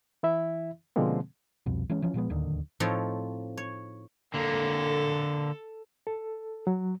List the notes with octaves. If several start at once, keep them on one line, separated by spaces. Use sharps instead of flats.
E3 E4 E5
B2 D3 F3 G#3 A#3 C4
C2 F2 B2
E3 G#3 C#4
E3 F3 C#4
A#2 F3 G#3 B3
D1 D#2 D3 D#3
A2 F3 C4 D#4 A4 C#5
C#5
D3 A#3 A4
A4
F#3